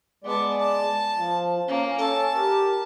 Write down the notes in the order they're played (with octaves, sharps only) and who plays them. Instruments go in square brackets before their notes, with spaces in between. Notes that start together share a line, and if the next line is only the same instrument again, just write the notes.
[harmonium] G#3 D5 [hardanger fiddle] B3 A5
[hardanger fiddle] A5
[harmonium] F3
[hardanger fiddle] A#3 [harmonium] C#4
[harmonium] C#4 A4 [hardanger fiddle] A5
[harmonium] G4 A#4